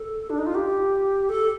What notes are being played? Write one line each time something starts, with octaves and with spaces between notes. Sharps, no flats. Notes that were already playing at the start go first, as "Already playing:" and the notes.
Already playing: A4
D4
D#4
F4
G4
A4